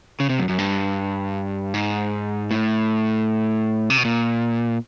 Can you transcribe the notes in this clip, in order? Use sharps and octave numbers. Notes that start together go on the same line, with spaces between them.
C#3
C3
F#2
F#2
G2
G#2
A2
C3
B2
A#2